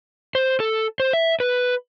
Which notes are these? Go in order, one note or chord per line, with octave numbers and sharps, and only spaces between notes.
C5
A4
C5
E5
B4